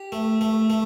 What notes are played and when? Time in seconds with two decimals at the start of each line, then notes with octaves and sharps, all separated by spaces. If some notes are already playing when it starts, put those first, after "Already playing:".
Already playing: G4
0.12 A3
0.41 A3
0.70 A3